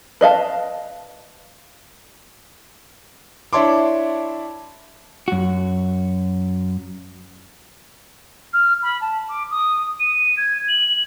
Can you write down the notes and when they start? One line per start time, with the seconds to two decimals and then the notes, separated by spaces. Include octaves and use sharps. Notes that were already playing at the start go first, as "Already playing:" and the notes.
0.21 B4 D#5 F5 A5
3.53 D4 E4 C#5 A5 C6 D6
5.28 F#2 F#4
8.53 F6
8.82 B5
9.01 A5
9.28 D6
9.51 D#6
10.00 D#7
10.37 G#6
10.68 F#7